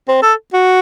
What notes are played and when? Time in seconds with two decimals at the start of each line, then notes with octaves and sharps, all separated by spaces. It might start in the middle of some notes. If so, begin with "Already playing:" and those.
0.08 C4
0.23 A4
0.53 F#4